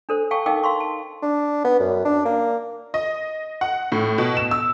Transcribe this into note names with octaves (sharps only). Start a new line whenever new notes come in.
D4 A4 C5
F5 G5 A5 C#6
D#4 A#4 D#5 F5 G5 D6
F5 C6 C#6
A5
D4
B3
F#2
D4
A#3
D#5
F#5
A2
B2
E7
E6